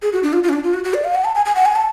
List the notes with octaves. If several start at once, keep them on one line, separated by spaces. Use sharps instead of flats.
G#4
F#4
D4
F4
F4
C#4
D4
F4
F#4
F#4
D5
F5
F#5
A5
G#5
G#5
F#5
G#5
A5